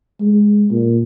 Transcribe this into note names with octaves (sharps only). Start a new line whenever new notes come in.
G#3
A#2